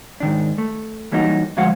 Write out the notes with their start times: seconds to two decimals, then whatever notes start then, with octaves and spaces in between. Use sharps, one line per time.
0.20 G#2 D#3 D4
0.58 A3
1.12 E3 F#3 G3 A#3 D#4 F#4
1.57 D2 F3 G#3 F#4 F5 F#5